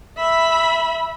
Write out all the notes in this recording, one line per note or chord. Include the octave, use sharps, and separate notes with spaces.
E5 B5